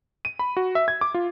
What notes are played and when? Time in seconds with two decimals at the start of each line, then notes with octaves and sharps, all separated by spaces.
0.25 D#7
0.39 B5
0.57 F#4
0.75 E5
0.88 G#6
1.01 D6
1.14 F4